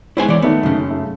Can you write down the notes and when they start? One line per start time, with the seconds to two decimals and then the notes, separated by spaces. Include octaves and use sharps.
0.17 G#3 B3 E4 C5 C#5 G#5
0.28 E3 D5
0.42 D#3 A3 B3 D#4
0.63 F#2 C#3
0.90 A3